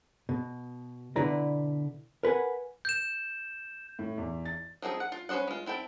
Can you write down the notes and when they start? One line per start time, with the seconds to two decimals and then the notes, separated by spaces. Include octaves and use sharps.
0.29 B2
1.16 B2 D3 E4 B4 D5 A#5
2.23 A#4 B4 F#5 G#5
2.85 G6 E7
3.99 A2
4.18 E2
4.45 A6
4.82 F3 C4 D#4 G#4
5.00 F#5
5.12 F4
5.29 C#4 B4 C5 D#5 F#5
5.48 G#3 F4
5.66 C4 E4 A4 G5